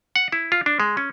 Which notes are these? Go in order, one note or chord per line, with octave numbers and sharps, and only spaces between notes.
F#5
E4
F4
D4
G#3
C#4